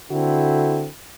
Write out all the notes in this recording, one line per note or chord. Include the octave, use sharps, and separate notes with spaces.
D3 C4 E4 F#4 A4